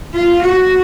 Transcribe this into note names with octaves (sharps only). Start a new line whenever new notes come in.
F4
F#4